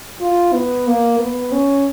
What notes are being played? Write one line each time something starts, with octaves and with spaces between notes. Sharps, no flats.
F4
B3
A#3
B3
C#4